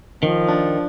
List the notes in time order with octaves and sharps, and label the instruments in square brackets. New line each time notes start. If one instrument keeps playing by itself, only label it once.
[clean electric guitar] D#3 [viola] F3
[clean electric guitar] D4